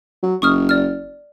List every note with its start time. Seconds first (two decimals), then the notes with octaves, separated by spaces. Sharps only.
0.23 F#3
0.42 F#1 C#6 D#6 F6
0.69 D5 F6